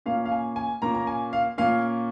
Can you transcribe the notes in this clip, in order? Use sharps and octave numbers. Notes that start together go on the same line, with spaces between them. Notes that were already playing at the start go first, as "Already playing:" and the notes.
A#2 A#3 C#4 F5
F5
G#5
G#5
A#2 A#3 C#4 A#5
A#5
G#5
F5
A#2 A#3 C#4 F5